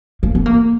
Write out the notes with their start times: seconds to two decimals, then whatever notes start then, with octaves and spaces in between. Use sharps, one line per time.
0.23 A#3
0.35 B3
0.46 A#3